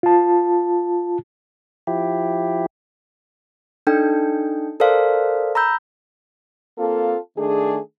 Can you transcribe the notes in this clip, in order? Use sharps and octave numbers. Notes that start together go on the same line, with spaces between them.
F4 A5
F3 E4 G4
D4 D#4 A4 G5
A4 A#4 C5 D5 F5
A#5 B5 E6 G6
A#3 C4 F4 A4
D#3 A3 D4 G#4